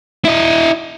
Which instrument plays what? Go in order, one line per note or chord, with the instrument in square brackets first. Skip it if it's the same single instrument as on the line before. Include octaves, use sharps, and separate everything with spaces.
[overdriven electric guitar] E4 D#5